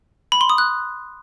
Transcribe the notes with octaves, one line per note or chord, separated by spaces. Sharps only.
B5
C6
D#6
F#6